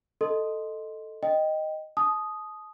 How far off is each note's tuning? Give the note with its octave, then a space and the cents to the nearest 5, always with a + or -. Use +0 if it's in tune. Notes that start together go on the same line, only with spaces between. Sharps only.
A4 +0 D#5 +0 C6 +0
D#5 +0 G5 +0
A5 -40 D#6 +0